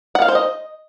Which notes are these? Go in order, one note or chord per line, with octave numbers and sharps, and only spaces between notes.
F#5
F5
C5
D#5